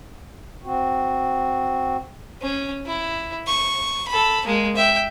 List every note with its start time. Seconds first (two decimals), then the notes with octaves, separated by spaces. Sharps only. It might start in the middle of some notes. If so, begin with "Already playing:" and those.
0.64 C4 F#4
2.42 C#4
2.86 E4
3.47 C#6
4.08 A4 B5
4.46 G#3 A#3
4.76 E5 G5